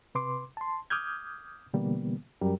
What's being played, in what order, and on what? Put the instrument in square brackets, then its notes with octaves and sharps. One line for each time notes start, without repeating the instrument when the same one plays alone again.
[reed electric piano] C3 B4 C6 D6
A5 C6
D6 D#6 F6 G6 G#6
B2 D3 E3 G3 A#3 B3
F#2 G3 G4 A#4